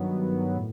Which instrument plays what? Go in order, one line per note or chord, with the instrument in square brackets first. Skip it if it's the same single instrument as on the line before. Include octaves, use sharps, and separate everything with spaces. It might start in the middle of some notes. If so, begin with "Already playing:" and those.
Already playing: [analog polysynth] G2 D#3 F#3 B3
A2